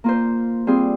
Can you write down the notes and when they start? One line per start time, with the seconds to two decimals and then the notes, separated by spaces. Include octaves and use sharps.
0.04 A#3 F4 C5
0.67 G3 C4 F4 G#4